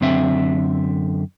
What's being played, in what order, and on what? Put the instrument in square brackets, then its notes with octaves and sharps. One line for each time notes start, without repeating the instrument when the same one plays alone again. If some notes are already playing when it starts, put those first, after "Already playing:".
[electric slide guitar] F#2 D3 C4 E5